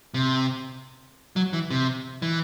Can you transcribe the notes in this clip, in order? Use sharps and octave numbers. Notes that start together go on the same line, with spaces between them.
C3
F#3
E3
C3
E3